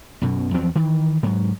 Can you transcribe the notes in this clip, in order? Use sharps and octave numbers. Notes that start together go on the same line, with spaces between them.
B1 F#2 B2
E2 F3 F#3 C4
D#3 E3
G#2 F#3